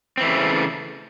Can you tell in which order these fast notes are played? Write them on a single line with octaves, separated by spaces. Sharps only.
C4 E3 A3 C#3